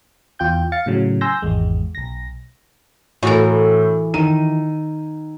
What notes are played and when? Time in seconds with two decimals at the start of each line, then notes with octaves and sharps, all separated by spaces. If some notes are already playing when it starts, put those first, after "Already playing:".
0.39 E2 F4 G5 G6
0.72 F5 A6 C#7
0.86 A2 C#3 F#3
1.21 G#5 C6 E6 G6 A#6
1.42 G#1 E2 G#3
1.95 B1 A#6
3.23 A2 E3 F#4 A4 A#4
4.14 D#3 D#7